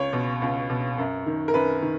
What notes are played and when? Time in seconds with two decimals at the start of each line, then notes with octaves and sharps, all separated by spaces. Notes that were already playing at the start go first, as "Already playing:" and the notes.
Already playing: C#2 C#5
0.13 B2
0.42 C#2
0.70 B2
0.98 F#2
1.26 D#3
1.48 A#4
1.54 F#2 B4
1.82 D#3